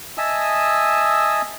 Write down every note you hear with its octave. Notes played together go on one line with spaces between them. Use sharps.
D#5 E5 G#5 A5 D#6 E6